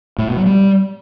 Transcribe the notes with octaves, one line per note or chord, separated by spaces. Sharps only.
A2
B2
F#3
G3